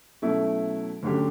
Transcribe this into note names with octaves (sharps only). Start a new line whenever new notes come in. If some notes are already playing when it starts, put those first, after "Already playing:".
B2 F#3 A3 C#4 E4
D2 D3 F#3 C#4 G4